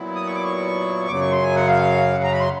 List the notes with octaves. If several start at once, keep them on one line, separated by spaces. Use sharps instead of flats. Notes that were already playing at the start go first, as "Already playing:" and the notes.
Already playing: A#2 F#3 B3 E4
D#6
C#6
D6
C#6
F#2 C#3 F#3 D6
C#6
C6
G#5
F#5
F5
F#5
A#5
B5
C6